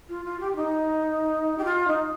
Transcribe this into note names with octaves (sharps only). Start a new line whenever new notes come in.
F4
F4
G4
D#4
G4
F4
D#4